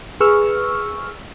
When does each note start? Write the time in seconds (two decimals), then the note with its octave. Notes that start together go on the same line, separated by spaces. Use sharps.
0.20 G#4 B4 C#6 E6 F6